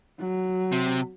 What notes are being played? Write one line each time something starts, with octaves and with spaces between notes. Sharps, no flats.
F#3
C3